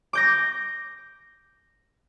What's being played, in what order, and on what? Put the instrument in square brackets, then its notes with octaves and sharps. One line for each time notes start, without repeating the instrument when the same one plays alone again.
[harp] D6 G6 A#6